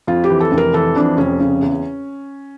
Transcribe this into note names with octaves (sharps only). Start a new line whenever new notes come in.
F2 F4
G4
E3
A4
F1
A#4
E3 A4
F2 D4
F1 C#4
C#3
E2